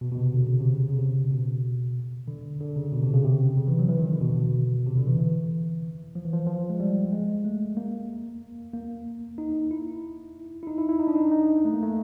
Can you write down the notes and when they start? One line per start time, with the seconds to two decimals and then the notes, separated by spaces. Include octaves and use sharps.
0.01 B2
0.12 B2
0.17 C3
0.34 D3
0.47 C#3
0.60 C3
0.73 C#3
0.88 C#3
0.99 C3
1.31 B2
2.27 D3
2.60 D3
2.76 C#3
2.92 B2
3.03 C3
3.13 C#3
3.24 C3
3.57 C#3
3.68 E3
3.79 F#3
3.89 E3
4.00 D#3
4.10 D3
4.21 B2
4.87 C3
4.97 D3
5.07 E3
5.19 E3
6.15 F3
6.25 E3
6.33 F3
6.47 F3
6.70 G#3
6.80 G3
7.13 G#3
7.45 A3
7.77 A#3
8.73 A#3
9.38 D#4
9.71 E4
10.63 E4
10.67 D#4
10.78 E4
10.89 E4
10.99 D#4
11.08 D4
11.16 D#4
11.32 D#4
11.65 A3
11.73 A#3
11.83 A3